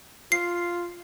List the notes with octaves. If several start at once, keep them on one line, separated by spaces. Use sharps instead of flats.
F4 C7